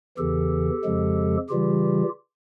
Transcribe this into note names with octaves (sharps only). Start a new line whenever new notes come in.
E2 C#3 E3 G4 A4
F2 C#3 F3 G#3
C#3 E3 G3 F4 G4